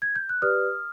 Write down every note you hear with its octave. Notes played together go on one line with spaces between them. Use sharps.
G#6
G6
F#6
G4 B4 D5 D#6 F6